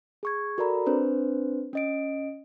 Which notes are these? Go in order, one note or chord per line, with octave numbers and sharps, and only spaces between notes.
G#4 C#6 G#6
F#4 A4 A#4 D5 A#5 B5
C4 D4 B4 C5
C#4 D#5 D7